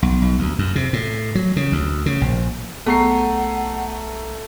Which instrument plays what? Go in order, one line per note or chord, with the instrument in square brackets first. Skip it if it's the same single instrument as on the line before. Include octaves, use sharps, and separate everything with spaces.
[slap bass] B1
B1
D2
F#2
C3
A2
F#3
C#3
D2
C#3
A#1
[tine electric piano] B1 A#5 [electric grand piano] A3 C#6 C7 [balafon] B3 G#4 [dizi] F#5